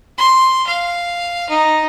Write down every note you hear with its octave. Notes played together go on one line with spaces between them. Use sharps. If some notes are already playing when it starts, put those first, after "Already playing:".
C6
F5
D#4